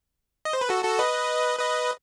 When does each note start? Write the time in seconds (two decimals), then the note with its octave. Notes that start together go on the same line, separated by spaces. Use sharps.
0.45 D#5
0.53 C5
0.61 B4
0.69 F#4 A4
0.84 F#4 A4
0.99 B4 D#5
1.59 B4 D#5